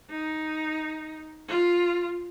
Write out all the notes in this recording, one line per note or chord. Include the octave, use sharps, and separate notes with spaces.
D#4
F4